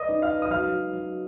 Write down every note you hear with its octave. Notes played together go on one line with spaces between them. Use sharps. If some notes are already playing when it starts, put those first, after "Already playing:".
Already playing: B4 D5 D#5 D#6
D#4
F5 F6
B4
D#6
F#3 F5 F6
F#3
F#3